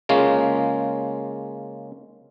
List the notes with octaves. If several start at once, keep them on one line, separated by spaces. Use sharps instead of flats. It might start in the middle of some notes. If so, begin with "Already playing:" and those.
C#3 G#3 A#3 C#4 F4